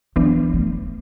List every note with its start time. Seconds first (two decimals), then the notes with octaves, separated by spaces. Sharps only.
0.16 E3 F#3 B3 D4
0.54 A3